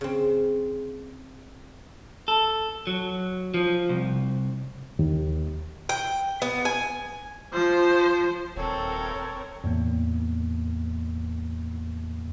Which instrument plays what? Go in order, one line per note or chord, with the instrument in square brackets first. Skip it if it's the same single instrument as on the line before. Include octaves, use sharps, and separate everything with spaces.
[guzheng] C#3 C4
[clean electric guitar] A4
F#3
F3
C2
[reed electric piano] D#2
[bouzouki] G5
B3
G#5
[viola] F3 C5
[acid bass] D#1 [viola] C4 A#4 [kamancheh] A4 [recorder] C#5
[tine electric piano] E2 A2 A#3